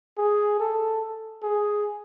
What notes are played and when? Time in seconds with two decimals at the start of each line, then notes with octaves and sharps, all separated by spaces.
0.18 G#4
0.60 A4
1.43 G#4